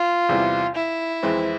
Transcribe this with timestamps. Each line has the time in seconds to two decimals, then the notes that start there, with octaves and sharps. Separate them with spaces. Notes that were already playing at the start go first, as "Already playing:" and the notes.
Already playing: F4
0.29 E2 C3 E3 G3
0.75 E4
1.23 F2 E3 G#3 C4